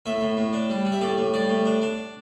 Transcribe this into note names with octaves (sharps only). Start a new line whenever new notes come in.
A2 E5
A2
A2
D4
G3
G3
E5
A2 D5
A2
G3 D5
A2
D4
D4